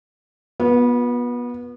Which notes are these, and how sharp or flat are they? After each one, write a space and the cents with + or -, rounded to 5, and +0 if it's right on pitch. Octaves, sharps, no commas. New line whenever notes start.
B3 -25 F4 +40